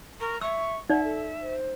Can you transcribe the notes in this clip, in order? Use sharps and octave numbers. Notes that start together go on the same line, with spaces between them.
A#4 C#6
E5 C#6 E6
D#4 D5 E5 F#5
A4
C5